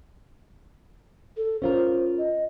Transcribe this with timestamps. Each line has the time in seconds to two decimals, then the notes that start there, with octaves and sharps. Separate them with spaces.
1.37 A4
1.62 C#4 F4 A#4 C5
2.19 D#5